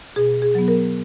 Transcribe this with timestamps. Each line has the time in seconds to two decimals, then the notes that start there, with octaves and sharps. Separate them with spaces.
0.16 B2 G#4
0.42 G#4
0.55 F#3 B3
0.68 A#4